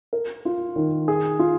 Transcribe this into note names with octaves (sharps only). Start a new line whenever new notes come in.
A#4
F4
D#3
G#4
F4